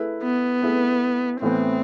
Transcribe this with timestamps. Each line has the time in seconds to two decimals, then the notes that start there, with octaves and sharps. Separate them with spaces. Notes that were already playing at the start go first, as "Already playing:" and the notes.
Already playing: A3 E4 G#4 B4
0.23 B3
0.62 A3 E4 G#4 B4
1.41 A2 E3 B3 C4